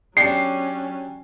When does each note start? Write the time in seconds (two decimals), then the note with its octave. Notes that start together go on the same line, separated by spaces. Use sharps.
0.17 F#3 C#4 D4 G4 D5 C7